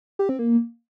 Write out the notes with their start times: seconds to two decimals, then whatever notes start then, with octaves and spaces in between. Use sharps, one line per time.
0.19 G4
0.29 C4
0.39 A#3